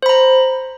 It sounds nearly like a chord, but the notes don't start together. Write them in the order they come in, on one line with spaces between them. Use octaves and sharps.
C5 B5 A#5